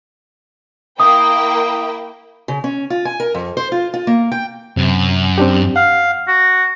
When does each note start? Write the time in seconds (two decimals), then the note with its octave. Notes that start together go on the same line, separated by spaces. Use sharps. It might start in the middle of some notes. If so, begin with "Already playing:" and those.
1.00 A#3 E4 G5 D#6
2.48 C#3
2.64 C#4
2.90 F4
3.05 G#5
3.20 A#4
3.34 F2
3.57 C5
3.72 F4
3.94 F4
4.07 A#3
4.32 G5
4.77 F#2 C3
5.38 C4 D4 G4
5.76 F5 F#5
6.28 F#4